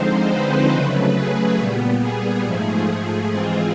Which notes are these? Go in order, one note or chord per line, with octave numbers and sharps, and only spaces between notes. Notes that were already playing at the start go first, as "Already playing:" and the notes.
Already playing: D3 F3 G#3 C4 D#4 C5
B4
C#3 F#3 A3 B4
G#4
A#2 G3 B3
G#4
G#2 F3 A3 G#4
G#4
G#2 E3 G#3 C4 F4 G#4